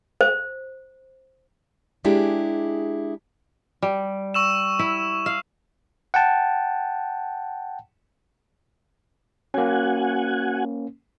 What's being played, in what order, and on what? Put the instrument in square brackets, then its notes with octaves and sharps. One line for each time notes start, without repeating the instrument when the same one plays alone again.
[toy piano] C5
[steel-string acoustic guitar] G#3 D4 E4 G4 G#4
[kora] G3
[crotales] C#6 E6 E7
[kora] E4
F5
[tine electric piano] F#5 G5 A5
[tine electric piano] A#3 C#4 [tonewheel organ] F#4 F#5 G#5